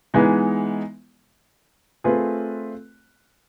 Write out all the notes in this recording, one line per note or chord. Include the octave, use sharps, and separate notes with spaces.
E3 G#3 B3 D#4
A3 C4 F4 G#4 B4